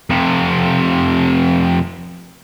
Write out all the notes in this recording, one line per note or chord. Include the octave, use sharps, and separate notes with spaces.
F2 C3